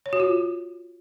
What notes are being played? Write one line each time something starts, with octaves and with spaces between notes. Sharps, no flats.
C#5
F#4
F4